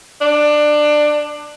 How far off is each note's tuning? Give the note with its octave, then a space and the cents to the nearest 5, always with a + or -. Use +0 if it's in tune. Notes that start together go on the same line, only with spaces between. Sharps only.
D4 +20